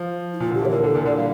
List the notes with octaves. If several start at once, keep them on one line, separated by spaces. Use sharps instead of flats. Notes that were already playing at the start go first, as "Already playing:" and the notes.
Already playing: F3
E4
A#2 F4
D3 G4
E3 C#5
D3 A#4
D3 A4
A#2 A#4
D3 D5
G3 F5